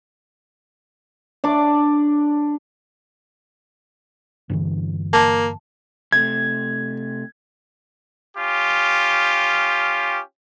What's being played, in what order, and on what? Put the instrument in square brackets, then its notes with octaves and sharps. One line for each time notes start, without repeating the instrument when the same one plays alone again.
[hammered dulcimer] D4 D5 D6
[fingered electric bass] G2 D3 E3
[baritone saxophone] A#3 [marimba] A5
[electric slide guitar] C3 A3 [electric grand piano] G#6
[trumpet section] C#4 F4 G4